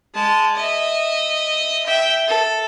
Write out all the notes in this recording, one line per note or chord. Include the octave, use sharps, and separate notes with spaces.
G#3 A5
D#5 E5
E5 G5
A4